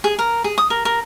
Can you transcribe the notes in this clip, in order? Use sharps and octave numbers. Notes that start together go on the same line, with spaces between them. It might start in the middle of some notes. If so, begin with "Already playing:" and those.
G#4
A#4
G#4
D#6
A#4
A#4